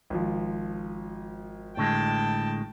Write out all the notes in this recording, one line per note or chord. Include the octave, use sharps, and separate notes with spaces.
G#1 F3
A2 D3 G#3 G5 A5